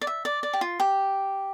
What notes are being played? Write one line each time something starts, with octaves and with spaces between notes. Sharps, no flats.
D5
E5
D5
D5
G4
F4
G4